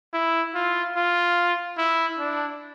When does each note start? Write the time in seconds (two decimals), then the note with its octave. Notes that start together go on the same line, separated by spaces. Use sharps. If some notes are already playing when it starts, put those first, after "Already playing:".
0.13 E4
0.54 F4
0.96 F4
1.78 E4
2.19 D4